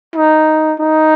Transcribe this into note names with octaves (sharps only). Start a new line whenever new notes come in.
D#4
D#4